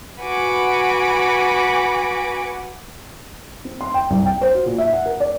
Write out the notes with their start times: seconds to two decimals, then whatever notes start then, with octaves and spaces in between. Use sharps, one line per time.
0.20 F#4 B4 F#5 G#5 B5 D6
3.65 C4
3.81 C6
3.94 G5
4.10 C2
4.25 G5
4.41 C5
4.55 F#4
4.66 A#2
4.78 E5
4.93 F#5
5.06 A#4
5.20 D5